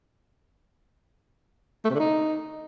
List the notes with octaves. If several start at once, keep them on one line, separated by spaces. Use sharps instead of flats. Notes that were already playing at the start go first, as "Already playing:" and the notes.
A3
C3
D3
D#4